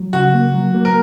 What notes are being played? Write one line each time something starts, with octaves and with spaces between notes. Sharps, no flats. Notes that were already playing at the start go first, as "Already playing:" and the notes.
Already playing: F#3
C#3 F#4
A#3
F#3
A#3
A#4